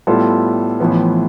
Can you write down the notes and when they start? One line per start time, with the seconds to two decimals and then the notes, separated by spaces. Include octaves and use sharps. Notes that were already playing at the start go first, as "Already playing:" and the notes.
0.07 A2 G3 B3 F4 A4
0.80 A1 A2 F3 B3